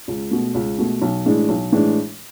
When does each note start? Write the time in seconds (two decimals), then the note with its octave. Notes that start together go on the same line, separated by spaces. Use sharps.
0.08 C#2
0.31 B2 A3
0.55 C#2
0.78 B2 A3
1.02 B1
1.26 A2 E3 G#3 D4
1.49 B1
1.72 A2 E3 G#3 D4